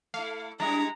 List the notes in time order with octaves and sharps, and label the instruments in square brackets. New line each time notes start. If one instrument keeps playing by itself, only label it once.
[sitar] A3 E4 [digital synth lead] F5
[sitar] G3 G#3 E4 [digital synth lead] D4 [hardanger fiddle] A#5